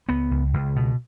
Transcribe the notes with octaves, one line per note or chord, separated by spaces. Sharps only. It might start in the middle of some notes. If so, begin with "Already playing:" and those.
C#2 B3
C#2
C#2
B2